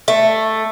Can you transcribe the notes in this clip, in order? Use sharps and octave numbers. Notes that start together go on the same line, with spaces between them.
A3